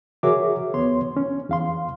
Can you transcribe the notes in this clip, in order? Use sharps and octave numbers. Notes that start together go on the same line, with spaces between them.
F#4 G#4 A#4 C#5 E5 D6
D#2 B3 C#5 C6
C#4
E2 F5 C6